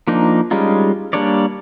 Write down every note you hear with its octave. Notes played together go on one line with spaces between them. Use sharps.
F3 A#3 D4 D#4
G3 G#3 C#4 D#4 F4
G3 A#3 D4 C#5 D5